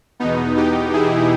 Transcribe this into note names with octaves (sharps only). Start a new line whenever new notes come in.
E2 B2 B3 D#4
D#4 G4
E4 G#4